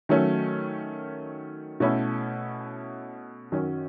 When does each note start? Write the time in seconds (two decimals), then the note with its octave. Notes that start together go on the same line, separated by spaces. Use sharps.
0.09 D#3 F#3 A3 C#4
1.80 B2 A3 C#4 E4
3.52 F#2 D#3 F#3 C#4